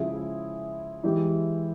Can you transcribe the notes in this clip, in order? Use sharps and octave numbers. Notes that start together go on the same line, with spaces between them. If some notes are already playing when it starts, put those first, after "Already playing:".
Already playing: C#3 F3 G#3 E4 G#4
E3 G#3 E4 G4